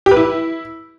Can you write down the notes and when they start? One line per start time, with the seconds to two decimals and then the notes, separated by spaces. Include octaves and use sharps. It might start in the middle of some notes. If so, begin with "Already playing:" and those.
0.06 G4
0.11 B4
0.17 E4